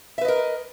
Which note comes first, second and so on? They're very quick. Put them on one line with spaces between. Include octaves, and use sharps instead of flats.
E5 B4 D#5 A#4